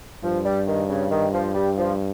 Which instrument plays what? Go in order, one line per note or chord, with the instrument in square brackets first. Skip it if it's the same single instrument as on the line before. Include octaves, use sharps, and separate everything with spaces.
[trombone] G2 [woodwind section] F3
[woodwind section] G3
D#3
C#3
D#3
F3
G3
F3